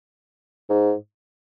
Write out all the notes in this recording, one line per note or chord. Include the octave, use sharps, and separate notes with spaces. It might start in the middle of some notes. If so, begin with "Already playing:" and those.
G#2